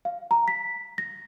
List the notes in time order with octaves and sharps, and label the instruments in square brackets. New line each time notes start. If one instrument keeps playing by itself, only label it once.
[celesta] F5
A#5
B6
A#6